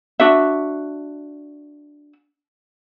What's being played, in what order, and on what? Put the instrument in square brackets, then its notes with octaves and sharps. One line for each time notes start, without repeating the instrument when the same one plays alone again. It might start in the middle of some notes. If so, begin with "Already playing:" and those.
[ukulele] D4 F#4 E5